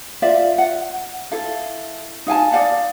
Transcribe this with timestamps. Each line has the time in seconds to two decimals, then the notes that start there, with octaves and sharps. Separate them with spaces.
0.22 F4 D5 E5 F5
0.58 F#5
1.31 E4 A4 F5
2.26 D#4 F5 G#5 A5
2.51 D5 F5 F#5 A5